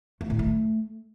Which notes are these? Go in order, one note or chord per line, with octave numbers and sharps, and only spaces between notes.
A3
A2
A3